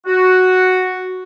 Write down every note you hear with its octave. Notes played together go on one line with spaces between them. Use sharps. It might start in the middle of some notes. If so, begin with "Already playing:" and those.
F#4